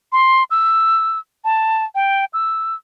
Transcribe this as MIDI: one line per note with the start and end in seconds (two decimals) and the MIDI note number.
0.12 0.44 84
0.51 1.19 88
1.45 1.85 81
1.95 2.25 79
2.33 2.75 88